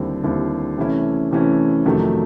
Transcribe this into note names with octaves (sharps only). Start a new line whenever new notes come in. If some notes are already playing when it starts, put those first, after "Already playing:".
Already playing: D#2 D3 G3 C4 E4
D#2 D3 G3 C4 E4
C3 E3 A3 C#4 E4
C3 E3 A3 C#4 E4
F2 C3 D#3 F#3 A3